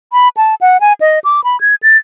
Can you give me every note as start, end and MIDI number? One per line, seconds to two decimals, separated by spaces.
0.13 0.29 83
0.37 0.55 81
0.61 0.80 78
0.81 0.93 80
1.01 1.19 75
1.24 1.44 86
1.44 1.59 83
1.61 1.75 92
1.83 1.97 93